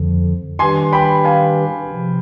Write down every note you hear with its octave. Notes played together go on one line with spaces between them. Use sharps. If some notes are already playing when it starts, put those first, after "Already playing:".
Already playing: F2 D3 F3
D#3 G3 D4 G4 B4 G#5 C6
G5 B5
F5 G#5
C3 F3